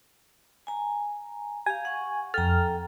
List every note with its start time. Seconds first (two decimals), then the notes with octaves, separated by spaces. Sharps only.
0.67 G#5 A#5
1.66 G4 F5 G#5
1.85 F#5 C#6
2.34 F2 A4 G5 A#5 F6